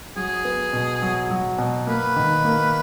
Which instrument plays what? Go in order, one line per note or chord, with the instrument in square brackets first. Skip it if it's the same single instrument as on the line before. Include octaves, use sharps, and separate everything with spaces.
[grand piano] F#3 [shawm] G#4
[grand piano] B3
B2
F#3
F#3
B2
[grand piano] A#3 [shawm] B4
[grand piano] D#3
A#3